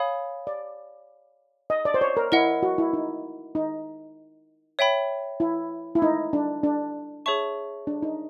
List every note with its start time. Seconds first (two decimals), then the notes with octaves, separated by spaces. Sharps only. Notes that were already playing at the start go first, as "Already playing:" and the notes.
Already playing: C#5 F5 G#5 B5 D#6
0.47 D5
1.70 D#5
1.85 D5
1.94 C5
2.01 C#5
2.17 A#4
2.32 E4 A#4 D#5 F#5
2.63 F#4
2.78 E4
2.93 D#4
3.55 D#4
4.79 C#5 E5 G5 B5
5.40 E4
5.95 E4
6.02 D#4
6.33 D4
6.63 D4
7.26 G#4 C#5 E5 A5 C#6
7.87 D4
8.03 D#4